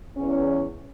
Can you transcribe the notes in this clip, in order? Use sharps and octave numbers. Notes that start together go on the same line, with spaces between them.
E2 C#4